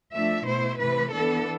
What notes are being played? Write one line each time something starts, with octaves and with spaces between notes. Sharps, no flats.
F3 A3 D4 E5
B2 A3 E4 C5
C3 E3 A3 B4
E3 B3 D4 A4